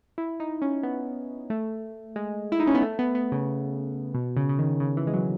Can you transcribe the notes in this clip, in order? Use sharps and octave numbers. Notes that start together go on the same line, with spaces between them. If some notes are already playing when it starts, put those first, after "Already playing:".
E4
D#4
C#4
B3
A3
G#3
E4
D#4
C#4
B3
A3
B3
B3
C#3
B2
C#3
C#3
D#3
C#3
E3
G#3
F#3